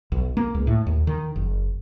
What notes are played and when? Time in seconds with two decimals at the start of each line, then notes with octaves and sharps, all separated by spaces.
0.12 B1
0.37 A#3
0.55 C#2
0.67 A2
0.86 D#2
1.07 D#3
1.36 F#1